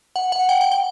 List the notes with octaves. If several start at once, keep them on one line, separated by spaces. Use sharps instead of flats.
F#5
F#5
G5
G5
G5